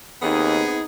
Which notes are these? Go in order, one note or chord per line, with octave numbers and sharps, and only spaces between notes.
D#2 B3 C4 D#4 G#4